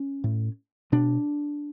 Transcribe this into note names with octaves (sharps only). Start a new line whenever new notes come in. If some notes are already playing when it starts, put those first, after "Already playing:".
Already playing: C#4
A2
B2 D4